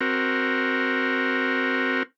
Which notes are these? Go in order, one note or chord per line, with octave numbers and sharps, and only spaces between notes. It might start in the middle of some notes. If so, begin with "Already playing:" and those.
C4 F#4 A#4